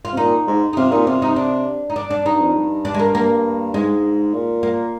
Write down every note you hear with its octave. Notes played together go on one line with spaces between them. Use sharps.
F4
C3
A#2 D#4
G#2
D#4
C3 F4
A#2 D#4
C3 F4
D#4
D4
D#4
D4
D4
G2 D#4
F2
G2
D4
G#3
A#3
A#3
G#2 G#3
A#2
A#3